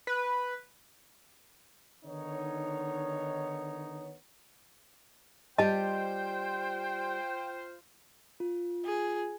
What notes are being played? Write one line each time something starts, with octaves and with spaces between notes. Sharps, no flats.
B4
D3 D#3 B3 D#4 C#5
G3 F4 G4 C5 D#5 G5 A5
F4
G#4